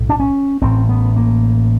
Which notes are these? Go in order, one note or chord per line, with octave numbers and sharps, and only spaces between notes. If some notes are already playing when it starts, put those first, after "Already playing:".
Already playing: B1 A2
D4
C#4
A1 A2 C4
B3
A#3